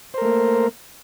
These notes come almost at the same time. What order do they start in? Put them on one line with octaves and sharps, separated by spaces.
C5 A#4 A3 A#3